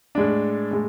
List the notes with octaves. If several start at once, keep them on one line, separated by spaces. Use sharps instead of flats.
A2 G#3 D4
A2 G#3